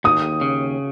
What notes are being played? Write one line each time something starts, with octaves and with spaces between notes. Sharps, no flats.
D#2 D#6
C#3